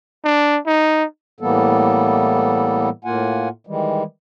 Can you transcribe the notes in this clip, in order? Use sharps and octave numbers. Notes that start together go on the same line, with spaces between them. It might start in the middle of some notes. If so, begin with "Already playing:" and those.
D4
D#4
A2 E3 G3 A#3 B3 A4
A2 A#3 F4 F#5 G#5
D#3 E3 G3 G#3